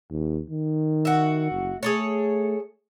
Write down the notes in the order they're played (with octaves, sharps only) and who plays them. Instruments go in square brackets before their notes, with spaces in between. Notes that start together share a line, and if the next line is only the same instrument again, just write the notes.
[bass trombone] D#2
D#3
[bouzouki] F#4 E5
[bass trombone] F#1
[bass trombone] A3 [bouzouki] G#4 A4 C#5